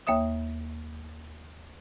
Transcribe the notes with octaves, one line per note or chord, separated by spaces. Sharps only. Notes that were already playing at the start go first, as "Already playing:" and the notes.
D#2 A#3 C#5 E5 D#6